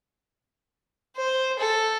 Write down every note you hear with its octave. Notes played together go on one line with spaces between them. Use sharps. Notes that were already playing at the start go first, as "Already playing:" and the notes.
C5
A4